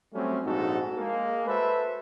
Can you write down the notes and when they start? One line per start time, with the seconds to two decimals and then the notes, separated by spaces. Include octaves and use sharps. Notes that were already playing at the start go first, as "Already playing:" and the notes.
0.14 F#3 G3 A3 C4 C#4
0.45 A#1 G#2 D#4 F#4 A4
0.97 G#3 A#3
1.47 F#4 A4 B4 C5 E5